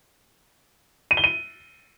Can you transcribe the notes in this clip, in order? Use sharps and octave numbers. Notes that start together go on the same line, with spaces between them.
D#7
G7
D#7